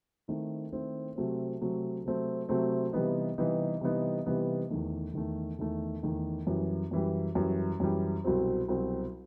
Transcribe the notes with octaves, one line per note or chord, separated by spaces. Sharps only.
D#3 A3 C4 E4
D#3 A3 C4 E4
C3 F#3 A3 C4
C3 F#3 A3 C4
C3 F#3 A3 C4
C3 F#3 A3 C4
C3 E3 G3 B3 D#4
C3 E3 G3 B3 D#4
C3 E3 G3 B3 D#4
C3 E3 G3 B3 D#4
E2 D#3 A3
E2 D#3 A3
E2 D#3 A3
E2 D#3 A3
F#2 E3 G3
F#2 E3 G3
F#2 E3 G3
F#2 E3 G3
C2 B2 F#3 C4
C2 B2 F#3 C4